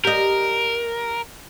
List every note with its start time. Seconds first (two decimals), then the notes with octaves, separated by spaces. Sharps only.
0.05 G4 A#4 D#5